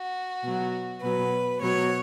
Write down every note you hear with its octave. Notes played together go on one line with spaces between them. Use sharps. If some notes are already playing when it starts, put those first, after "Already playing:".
Already playing: F#4
B2 F#3
B2 F#3 B4
B2 F#3 C#5